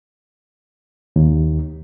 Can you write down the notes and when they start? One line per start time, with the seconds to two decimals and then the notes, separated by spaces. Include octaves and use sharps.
1.16 D#2